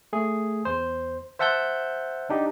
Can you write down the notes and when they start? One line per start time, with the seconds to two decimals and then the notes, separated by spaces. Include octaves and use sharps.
0.13 A3 G#4
0.65 E2 C5
1.39 C5 E5 F#5 A5 E6 G6
2.30 D4 D#4 G4